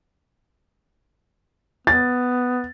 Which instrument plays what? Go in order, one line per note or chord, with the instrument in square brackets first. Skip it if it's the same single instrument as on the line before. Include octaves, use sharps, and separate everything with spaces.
[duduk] B3 [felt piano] A6